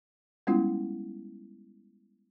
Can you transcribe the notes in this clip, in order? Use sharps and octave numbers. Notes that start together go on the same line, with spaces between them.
G3 G#3 B3 C#4 E4 F4